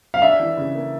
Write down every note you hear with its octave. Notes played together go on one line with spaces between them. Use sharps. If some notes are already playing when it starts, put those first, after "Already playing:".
F5
D4 E5
E3
C#3
A#3